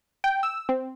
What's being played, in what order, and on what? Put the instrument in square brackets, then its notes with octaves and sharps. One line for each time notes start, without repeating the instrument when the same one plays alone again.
[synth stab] G5
E6
C4